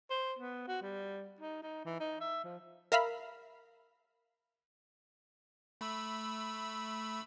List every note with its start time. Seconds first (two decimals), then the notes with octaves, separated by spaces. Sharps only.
0.10 C5
0.39 B3
0.68 F#4
0.82 G3
1.41 D#4
1.62 D#4
1.85 E3
2.00 D#4
2.21 E5
2.44 F3
2.92 A#4 E5 F5 B5
5.81 A3 B5 E6